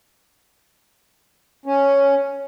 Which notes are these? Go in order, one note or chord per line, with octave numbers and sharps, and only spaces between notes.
C#4